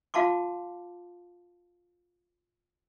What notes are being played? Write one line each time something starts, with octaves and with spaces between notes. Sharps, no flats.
F4 F5 A5 C6 D6